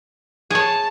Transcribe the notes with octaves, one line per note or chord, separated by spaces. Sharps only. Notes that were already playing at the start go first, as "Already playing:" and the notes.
G#4 C#5 A5